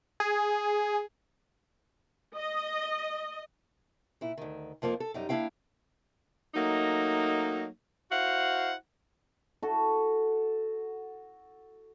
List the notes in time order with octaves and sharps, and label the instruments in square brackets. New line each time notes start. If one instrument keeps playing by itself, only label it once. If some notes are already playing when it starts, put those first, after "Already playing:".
[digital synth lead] G#4
[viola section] D#5
[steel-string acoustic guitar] A#2 E4
D2 D#3
F2 F3 A#3 F4
A4
F#2 G3 D#4
A#3 D4 E4 F5 G5
[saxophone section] F#3 A3 A#3 D#4
E4 F#4 C5 F5 F#5
[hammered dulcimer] F#4 A4